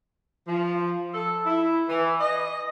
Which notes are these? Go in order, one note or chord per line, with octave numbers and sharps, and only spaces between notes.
F3
A4
E4
E3
D#5